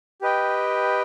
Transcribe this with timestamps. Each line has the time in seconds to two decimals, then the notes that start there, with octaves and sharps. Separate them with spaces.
0.21 G4 B4 D#5 G5